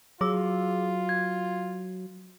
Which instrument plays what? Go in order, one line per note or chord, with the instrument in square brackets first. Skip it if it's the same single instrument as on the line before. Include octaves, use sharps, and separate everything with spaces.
[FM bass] F#3 [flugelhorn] F4 [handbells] G#4 D6 E6
[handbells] G#6